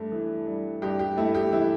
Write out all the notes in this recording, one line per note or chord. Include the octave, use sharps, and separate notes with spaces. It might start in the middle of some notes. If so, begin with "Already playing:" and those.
Already playing: G2 A3
E3
G2
G2 G4
G4
A3 E4
G4
E3 E4